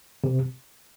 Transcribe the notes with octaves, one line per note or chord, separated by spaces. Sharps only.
C3